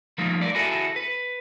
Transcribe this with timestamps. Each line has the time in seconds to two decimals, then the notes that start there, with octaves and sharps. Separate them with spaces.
0.18 F3 G3 A3 A#3 D#4 F4
0.41 A#4 B4 D5
0.55 E4 F#4 G#4 A4
0.96 B4